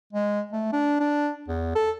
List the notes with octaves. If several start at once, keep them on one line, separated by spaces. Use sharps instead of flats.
G#3
A3
D4
D4
E2
A4